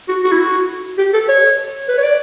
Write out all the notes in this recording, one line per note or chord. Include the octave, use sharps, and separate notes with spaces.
F#4
F#4
E4
F#4
G4
A4
C#5
B4
C#5
D5